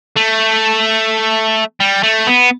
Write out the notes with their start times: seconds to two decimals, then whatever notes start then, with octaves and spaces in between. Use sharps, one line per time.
0.17 A3
1.80 G3
2.03 A3
2.27 B3